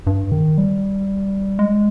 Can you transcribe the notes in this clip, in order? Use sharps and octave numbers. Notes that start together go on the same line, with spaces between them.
G2
D#3
G3
G#3